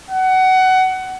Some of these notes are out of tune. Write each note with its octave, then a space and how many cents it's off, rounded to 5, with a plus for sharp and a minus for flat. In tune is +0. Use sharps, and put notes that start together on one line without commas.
F#5 +20